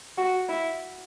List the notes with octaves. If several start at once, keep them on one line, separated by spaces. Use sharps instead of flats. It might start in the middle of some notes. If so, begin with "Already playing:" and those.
F#4
E4